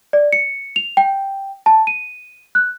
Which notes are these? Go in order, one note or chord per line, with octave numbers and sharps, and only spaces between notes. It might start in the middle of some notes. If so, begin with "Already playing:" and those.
D5
C#7
F7
G5
A5
D#7
F#6